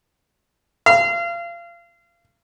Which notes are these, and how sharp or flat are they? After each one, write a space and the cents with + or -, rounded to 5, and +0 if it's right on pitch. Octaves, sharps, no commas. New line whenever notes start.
F5 -30